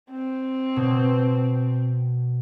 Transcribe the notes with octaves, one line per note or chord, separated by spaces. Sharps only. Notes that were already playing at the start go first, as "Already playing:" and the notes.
C4
B2